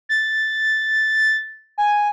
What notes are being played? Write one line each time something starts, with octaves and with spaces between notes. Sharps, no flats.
A6
G#5